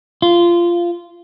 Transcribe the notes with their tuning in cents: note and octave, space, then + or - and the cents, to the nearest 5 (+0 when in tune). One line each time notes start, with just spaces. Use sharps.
F4 -15